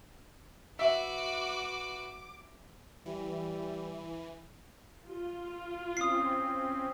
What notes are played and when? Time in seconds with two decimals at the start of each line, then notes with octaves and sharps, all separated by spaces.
0.79 F#4 B4 E5 D6
3.06 E3 G3
5.08 F4
5.97 C4 C#4 D#6 C7